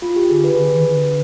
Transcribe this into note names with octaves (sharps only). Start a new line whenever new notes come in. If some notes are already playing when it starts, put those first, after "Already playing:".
F4
G4
D3 G#4
B4
D3 G#4
B4
D#3
D3